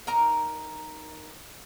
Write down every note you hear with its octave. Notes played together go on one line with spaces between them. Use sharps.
D#4 A#4 A#5